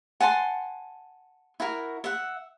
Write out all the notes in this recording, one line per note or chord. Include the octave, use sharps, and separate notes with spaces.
F#5 G#5 A5 C6
E4 F#4 A#4
E5 F#5